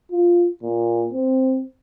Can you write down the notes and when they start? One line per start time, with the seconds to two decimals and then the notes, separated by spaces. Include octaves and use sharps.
0.12 F4
0.63 A#2
1.13 C4